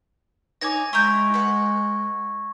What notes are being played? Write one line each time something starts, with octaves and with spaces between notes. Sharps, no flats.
D#4 C#5 G#5 D6 G#6 A#6
G#3 E4 A#5 C#6 G6
B4 F#5